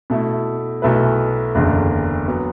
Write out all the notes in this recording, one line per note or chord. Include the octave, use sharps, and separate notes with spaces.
B2 A3 E4
B1 B2 A3 E4 B4
F#1 E2 D3
F#3 B3